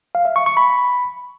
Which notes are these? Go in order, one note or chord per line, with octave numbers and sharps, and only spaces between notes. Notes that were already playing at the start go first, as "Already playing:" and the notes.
F5
E5
C#6
C#6
B5